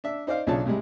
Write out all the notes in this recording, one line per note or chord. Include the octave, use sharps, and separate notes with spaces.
D4 E5
D#4 C5 D5 F5
B1 C#3 D4 F4 C#5 A5
A2 C3 G3 G#3